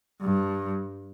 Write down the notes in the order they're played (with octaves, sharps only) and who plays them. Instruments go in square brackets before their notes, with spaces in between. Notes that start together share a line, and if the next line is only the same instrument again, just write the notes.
[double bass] G2